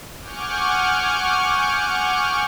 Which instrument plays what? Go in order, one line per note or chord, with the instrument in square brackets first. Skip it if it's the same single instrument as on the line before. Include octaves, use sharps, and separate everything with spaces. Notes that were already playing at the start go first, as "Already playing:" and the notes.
[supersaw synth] F#5 G#5 C#6 D6 F6 G6